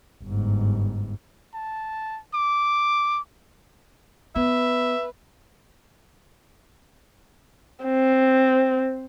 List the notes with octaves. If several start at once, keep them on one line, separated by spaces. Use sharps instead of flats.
G1 G#2
A5
D6
B3 B4 E5
C4